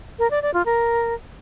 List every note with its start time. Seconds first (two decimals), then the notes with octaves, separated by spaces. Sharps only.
0.19 A#4
0.31 D5
0.42 D5
0.54 F4
0.66 A#4